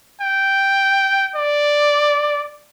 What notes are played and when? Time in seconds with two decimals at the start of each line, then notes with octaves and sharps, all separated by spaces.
0.21 G5
1.35 D5